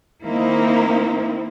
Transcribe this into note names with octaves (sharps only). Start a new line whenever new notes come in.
D#3 A#3 C4 D#4 E4